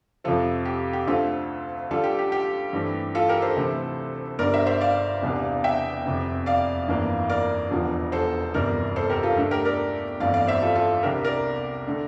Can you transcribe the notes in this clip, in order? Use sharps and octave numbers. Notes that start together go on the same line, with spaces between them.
F2 C3 F3 C4 F4 A4
G4
G4
D2 D3 A3 C4 F4 A4
D2 D3 G3 F4 A4
G4
G4
G4
G2 E3 A3 C4
F4 A4
G4 A#4
A4 C5
D2 C3 E3 A3
G1 G2 D3 G3 A#4 D5
C5 E5
C5 E5
D5 F5
E1 E2 C3 G3 D4
E5 G5
F1 F2 C3
D5 F5
G1 F2 E3 A#3 D4
A#4 D5
E1 E2 D3 F3
A4 C5
G1 F2 C3 E3 G3 A#4 D5
A4 C5
G4 A#4
F4 A4
G2 D3 A3 D4
G4 A#4
A#4 D5
G1 F2 E3 A3 D5 F5
D5 F5
C5 E5
F4 A4
F4 A4
C2 C3 G3 D4 G4 A#4
A#4 D5
D3 A3